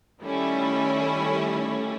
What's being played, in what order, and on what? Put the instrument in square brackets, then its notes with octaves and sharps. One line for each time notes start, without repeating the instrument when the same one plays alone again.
[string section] D#3 G3 A3 C#4 E4